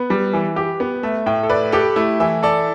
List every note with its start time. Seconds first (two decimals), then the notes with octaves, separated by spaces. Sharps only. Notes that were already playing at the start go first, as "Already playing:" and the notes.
Already playing: B3 B4
0.10 G3
0.33 E3
0.56 G4
0.80 B3
1.03 A3 E5
1.26 A2 G5
1.43 A4
1.50 B4 D5
1.72 G4 A4
1.96 A3 E4
2.20 E3 E5
2.43 A4 D5